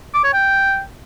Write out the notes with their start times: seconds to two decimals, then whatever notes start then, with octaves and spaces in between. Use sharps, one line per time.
0.14 D6
0.24 C#5
0.34 G5